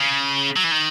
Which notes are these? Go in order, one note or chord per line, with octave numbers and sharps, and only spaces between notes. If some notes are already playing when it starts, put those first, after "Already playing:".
Already playing: C#3
F#3
E3
D#3